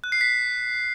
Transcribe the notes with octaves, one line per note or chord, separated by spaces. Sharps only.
F#6
C7
B6